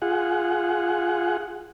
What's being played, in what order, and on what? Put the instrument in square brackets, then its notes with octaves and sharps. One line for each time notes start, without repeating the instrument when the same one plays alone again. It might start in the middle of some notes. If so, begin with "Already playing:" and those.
[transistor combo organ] F4 G#4 F#5